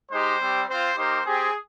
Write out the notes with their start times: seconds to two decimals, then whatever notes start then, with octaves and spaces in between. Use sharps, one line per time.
0.11 G#3 D#4 G4 C5
0.40 G3 C4 G4
0.69 C4 F4 C5
0.97 A#3 D#4 G4 C5
1.25 C4 G4 G#4